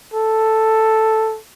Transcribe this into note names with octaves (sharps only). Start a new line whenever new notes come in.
A4